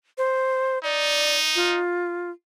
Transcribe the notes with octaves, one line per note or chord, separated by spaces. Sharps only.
C5
D#4 D5
F4